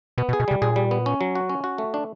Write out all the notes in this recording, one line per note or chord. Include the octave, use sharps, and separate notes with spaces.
B2 B3
B2
G#4
B2
C3 G3
A#2 G#4
G3
B3
C#4
F#3
F#4
C#4
F#4
A3
D4